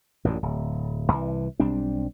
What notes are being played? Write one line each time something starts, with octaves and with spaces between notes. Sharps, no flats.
A1 F#2 A#2
D1
C2 E3
B1 G3 C4 D4